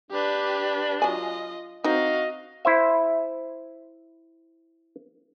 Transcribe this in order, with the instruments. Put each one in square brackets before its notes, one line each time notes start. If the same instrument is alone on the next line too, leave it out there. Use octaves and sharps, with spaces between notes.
[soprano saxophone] D4 [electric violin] G4 B4
[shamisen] F#3 G#5 [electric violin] F4 D#5
[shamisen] C4 D#4 [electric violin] F#4 F5 [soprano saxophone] D#5
[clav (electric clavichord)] E4 C5 E5